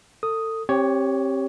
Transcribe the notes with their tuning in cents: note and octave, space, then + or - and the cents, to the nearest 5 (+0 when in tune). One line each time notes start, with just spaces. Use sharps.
A4 +30 D#6 +0
C4 +35 G4 +0 C#5 +10